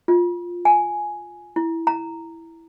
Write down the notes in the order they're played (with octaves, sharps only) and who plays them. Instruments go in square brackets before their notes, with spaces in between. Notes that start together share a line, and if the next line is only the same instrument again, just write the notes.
[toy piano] F4
G#5
E4
A#5